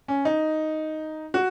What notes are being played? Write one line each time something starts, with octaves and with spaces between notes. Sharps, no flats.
C#4
D#4
F#4